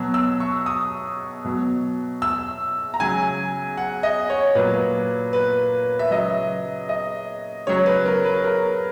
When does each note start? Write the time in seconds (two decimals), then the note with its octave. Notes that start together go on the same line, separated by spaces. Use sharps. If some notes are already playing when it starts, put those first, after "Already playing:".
Already playing: B2 F#3
0.14 E6
0.40 C#6
0.66 D#6
1.45 B2 F#3
2.22 E6
2.94 A#5
3.00 C#3 F#3 G#5
3.77 F#5
4.03 D#5
4.30 C#5
4.55 A#2 F#3 B4
5.33 B4
5.99 E5
6.11 C#3 F#3 D#5
6.89 D#5
7.67 C#3 F#3 C#5
7.86 B4
8.05 A#4
8.25 B4
8.44 A#4